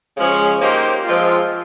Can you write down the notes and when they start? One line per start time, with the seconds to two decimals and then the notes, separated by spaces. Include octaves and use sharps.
0.17 C#3 F3 G#3 C#4 G#4
0.61 A#3 D#4 G4 C5
1.04 F3 G#3 C4 F4